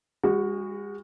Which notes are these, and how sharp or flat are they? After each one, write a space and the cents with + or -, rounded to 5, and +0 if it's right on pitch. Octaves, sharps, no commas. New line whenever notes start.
G#3 -45 F#4 +0